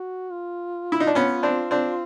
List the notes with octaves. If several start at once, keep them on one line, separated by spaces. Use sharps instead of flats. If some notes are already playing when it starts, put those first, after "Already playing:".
Already playing: F#4
F4
E4
D#4
D4
B3 C#4
C4 D4
C4 D4